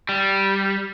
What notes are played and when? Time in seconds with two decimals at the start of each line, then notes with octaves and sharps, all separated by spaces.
0.09 G3